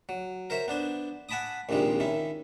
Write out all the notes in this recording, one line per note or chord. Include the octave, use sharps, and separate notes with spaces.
F#3
A#4 C5 C#5 E5
B3 D4 C5
F#5 G#5 A5 B5 D6 D#6
A#1 D#2 C3 F3 G3 G#3
D#3 C#4 E4